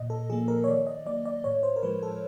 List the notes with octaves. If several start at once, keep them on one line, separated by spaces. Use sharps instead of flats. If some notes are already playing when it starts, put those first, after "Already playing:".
Already playing: A#2 D#5
A4
F3 A#3 G#4
A#4
C#5
D#3 D5
D#5
F#3 A#3 D5
D5
A2 C#5
C5
A#4
F3 G#3 B4
A4